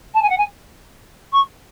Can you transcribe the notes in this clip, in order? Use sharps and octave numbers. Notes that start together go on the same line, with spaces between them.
A5
G#5
F#5
G#5
C#6